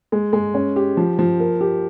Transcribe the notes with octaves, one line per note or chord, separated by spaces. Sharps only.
G#3
G#3
C#4
G4
F3
F3
A#4
G4